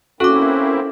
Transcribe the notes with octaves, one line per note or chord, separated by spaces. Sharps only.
A#3 C4 C#4 E4 F#4 A4 D6